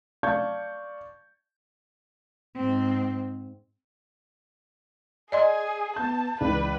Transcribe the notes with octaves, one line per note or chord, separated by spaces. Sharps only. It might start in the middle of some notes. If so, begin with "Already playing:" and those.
D5 F5 A5 C#6 G6 G#6
G#2 C4
G#4 D5 D#5 G#5 C6
B3 A5 G6
C#2 E3 B4 D5